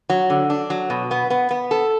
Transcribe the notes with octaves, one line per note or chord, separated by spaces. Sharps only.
F#3
D3
D4
F#3
B2
B3
B3
B3
A4